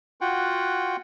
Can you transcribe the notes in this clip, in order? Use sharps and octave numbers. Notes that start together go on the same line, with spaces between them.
F4 F#4 F#5 G5